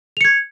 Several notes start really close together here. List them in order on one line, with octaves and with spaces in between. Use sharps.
F7 C#7 G#6